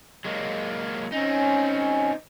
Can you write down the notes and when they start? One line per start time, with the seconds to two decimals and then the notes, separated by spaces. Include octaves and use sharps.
0.25 F#3 G#3 A#3
1.12 C4 C#4 D#4